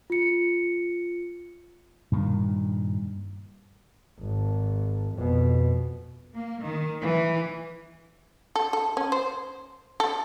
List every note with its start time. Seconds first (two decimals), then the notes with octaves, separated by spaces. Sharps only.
0.10 F4 C#7
2.12 G2 A#2 D#3
4.20 G#1
5.16 F2 B2
6.35 A#3
6.64 D#3
7.02 E3
8.56 A4
8.73 A4
8.97 C#4
9.12 C5
10.00 A4